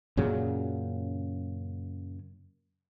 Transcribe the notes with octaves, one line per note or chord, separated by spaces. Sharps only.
F#2 A#2 C#3 F#3